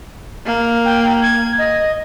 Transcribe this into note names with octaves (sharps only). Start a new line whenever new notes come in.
A#3
G5
G#6
D#5